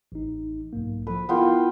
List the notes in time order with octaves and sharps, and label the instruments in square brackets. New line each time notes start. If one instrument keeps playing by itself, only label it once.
[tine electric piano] A1 D#4
B1 G#2 A#3
[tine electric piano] F3 A4 [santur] B4
[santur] B3 F4 G5 [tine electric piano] E4 G#4 A#4